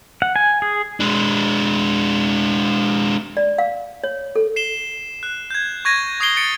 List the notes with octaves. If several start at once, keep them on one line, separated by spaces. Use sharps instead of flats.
F#5
G#5
G#4
G#3 D4
D5
F5
C#5
A4
C7 E7 G7
F#6
G6 G#6
C#6 G#6 A#6 D#7
C#6 D#6 G#6 C7 D7 G7
G#6 A6 C#7 D7